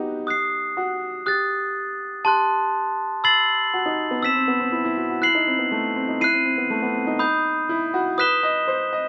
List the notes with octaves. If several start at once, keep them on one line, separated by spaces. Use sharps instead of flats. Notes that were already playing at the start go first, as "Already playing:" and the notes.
Already playing: B3 D#4 F#4 G4
D#6 F#6 C7
F#4
G4 D#6 F#6 A6
G4 A5 C6 F#6
B5 E6 A6 C7 F#7
F#4
D#4
B3
C4 E6 B6 E7
C4
B3
C4
E4
E4
F#4
F#4
E4 F#6 C7 F#7
D#4
C4
B3
A3
C4
D#4
E4 F#6 C7 D#7
C4
C4
B3
A3
B3
C4
D#4
B5 D#6 G6
E4
F#4
B4 D#6 F#6 B6 E7 G7
D#5
C5
D#5